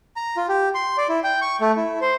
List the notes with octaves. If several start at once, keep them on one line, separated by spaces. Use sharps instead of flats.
A#5
F4
G4
C6
D5
E4
G5
C#6
A3
E4
C5